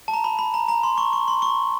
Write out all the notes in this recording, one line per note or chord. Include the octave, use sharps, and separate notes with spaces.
A5
A#5
B5
B5
A#5
A#5
C6
C#6
C#6
C6
C#6